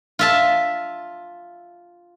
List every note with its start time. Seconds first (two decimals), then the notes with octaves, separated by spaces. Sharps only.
0.19 F4 E5 A5